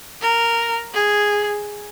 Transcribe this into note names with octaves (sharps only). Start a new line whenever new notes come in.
A#4
G#4